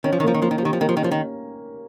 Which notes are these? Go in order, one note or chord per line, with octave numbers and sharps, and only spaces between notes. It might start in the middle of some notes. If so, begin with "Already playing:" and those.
D#3 C#4
F3
D#3
F3 A#3
D#3
F3 A#3
D#3
F3
D#3 G4
F3
D#3 A#3
F3
D#3
F3 C#4
D#3